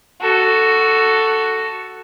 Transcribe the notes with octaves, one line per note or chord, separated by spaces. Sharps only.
F#4 A4